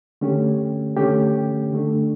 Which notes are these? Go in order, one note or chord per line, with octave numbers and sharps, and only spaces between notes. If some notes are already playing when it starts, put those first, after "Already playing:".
D3 A3 C#4 G4
D3 A3 C#4 G4
D3 A3 D4